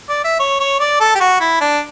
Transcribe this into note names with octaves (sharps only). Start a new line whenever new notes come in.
D5
E5
C#5
C#5
D5
A4
G4
F#4
E4
D4